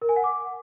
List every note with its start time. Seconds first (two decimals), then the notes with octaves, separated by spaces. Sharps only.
0.02 A#4
0.09 G#5
0.16 F#5
0.24 D6